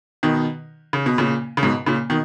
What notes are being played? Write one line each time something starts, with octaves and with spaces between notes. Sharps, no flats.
B2 D#3
C#3
B2
A#2 C#3
C#3
G#2 B2
A#2 C#3
B2 D#3